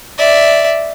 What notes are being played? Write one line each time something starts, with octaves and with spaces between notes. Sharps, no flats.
D5 E5